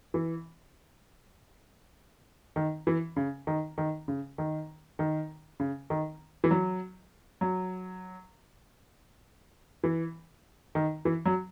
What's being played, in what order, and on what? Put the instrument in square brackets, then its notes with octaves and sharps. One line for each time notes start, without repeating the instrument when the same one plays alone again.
[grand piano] E3
D#3
E3
C#3
D#3
D#3
C#3
D#3
D#3
C#3
D#3
E3
F#3
F#3
E3
D#3
E3
F#3